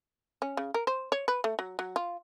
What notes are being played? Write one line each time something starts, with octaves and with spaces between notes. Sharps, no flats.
C#4
C#3
A#4
C5
C#5
B4
A3
F#3
F#3
F4